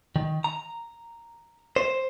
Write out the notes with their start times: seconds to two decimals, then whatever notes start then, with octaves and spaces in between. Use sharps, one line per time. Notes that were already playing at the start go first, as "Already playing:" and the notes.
0.16 D#3
0.44 A#5
1.76 C5